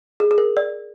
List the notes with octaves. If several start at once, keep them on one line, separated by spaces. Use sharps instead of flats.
G#4
G#4
A#4
D5